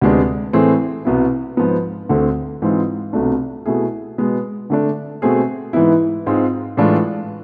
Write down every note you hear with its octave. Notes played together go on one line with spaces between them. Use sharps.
D2 C3 G#3 B3 D4
A2 E3 A3 C4 G#4
C2 B2 B3 E4
G#2 F3 B3
D2 D3 A3 C4
G#2 E3 G#3 C4 F4
C2 B2 A3 D4
B2 A3 E4 G#4
B2 G#3 B3
D3 A3 D4
B2 A3 C4 G#4
G#2 E3 B3 E4
G#2 G#3 C4 F4
A2 E3 G#3 D4 F4